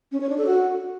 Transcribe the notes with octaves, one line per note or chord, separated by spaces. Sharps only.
C#4
C#5
D4
A4
F#4